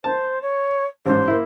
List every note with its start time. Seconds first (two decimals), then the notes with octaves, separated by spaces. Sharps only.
0.04 C5 A5
0.42 C#5
1.06 A1 G#2 C5
1.28 A#3 E4